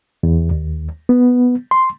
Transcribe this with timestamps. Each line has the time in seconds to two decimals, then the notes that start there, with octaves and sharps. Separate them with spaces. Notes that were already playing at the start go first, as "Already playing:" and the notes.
0.23 E2
0.51 D#2
1.09 B3
1.71 C6